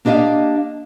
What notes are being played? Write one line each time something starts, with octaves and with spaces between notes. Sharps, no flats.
A#3 D4 G4 D#5 F5